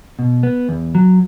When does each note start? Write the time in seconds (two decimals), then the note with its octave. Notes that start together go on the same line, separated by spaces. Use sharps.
0.19 B2
0.43 B3
0.69 E2
0.95 F#3